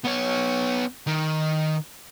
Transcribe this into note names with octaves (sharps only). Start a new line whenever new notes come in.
B3 C#5
D#3